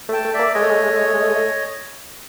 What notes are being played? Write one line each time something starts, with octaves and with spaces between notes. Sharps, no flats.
A3
G5 A5
A3
A#3 D5 E5
G#3 C#5 D#5
A3
G#3
A3
G#3
A3
G#3
A3
G#3
A3
G#3
A3